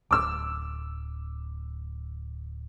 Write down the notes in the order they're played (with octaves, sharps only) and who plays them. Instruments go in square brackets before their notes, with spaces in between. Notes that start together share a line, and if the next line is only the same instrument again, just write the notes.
[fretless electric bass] D1 [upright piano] D6 E6